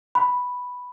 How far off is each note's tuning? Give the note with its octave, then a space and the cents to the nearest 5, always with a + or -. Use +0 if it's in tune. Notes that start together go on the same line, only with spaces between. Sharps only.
B5 +0